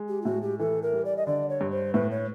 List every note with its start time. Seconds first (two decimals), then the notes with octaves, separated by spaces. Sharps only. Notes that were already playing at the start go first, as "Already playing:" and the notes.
Already playing: G#3
0.09 G4
0.22 F4
0.25 A2 F#4
0.42 G4
0.59 E3 A4
0.83 A#4
0.93 G3
1.05 D5
1.17 D#5
1.26 D3 D5
1.49 C#5
1.61 G2
1.72 C5
1.94 A2 B4
2.11 C#5